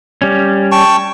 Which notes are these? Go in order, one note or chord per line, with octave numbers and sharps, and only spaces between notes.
G3 C#4
G5 A5 C#6